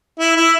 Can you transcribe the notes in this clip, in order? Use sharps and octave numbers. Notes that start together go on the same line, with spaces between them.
E4
E4